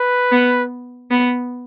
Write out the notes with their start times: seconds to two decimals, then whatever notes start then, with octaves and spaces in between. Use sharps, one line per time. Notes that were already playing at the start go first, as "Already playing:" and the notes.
Already playing: B4
0.32 B3
1.11 B3